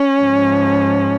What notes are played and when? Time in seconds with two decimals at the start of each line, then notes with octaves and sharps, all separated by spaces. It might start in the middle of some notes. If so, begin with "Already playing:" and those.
Already playing: C#4
0.20 G#2 F3